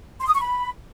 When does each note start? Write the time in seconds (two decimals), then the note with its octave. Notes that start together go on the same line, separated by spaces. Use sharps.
0.19 C6
0.26 D#6
0.33 C#6
0.40 B5